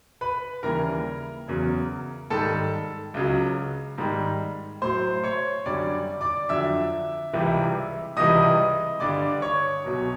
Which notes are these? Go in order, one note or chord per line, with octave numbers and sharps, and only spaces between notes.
B4 B5
D#2 C#3 E3 G3 A#4 A#5
E2 C#3 F#3
G#2 D#3 G3 A4 A5
C#2 C#3 F#3
G#2 D#3 G3
A2 F#3 C5 C6
C#5 C#6
F#2 D3 G3 D5 D6
D5 D6
F2 D3 F#3 E5 E6
C#2 C3 E3 G3
C#2 C3 E3 G3 D#5 D#6
G2 D3 G3 D5 D6
C#5 C#6
C2 B2 F#3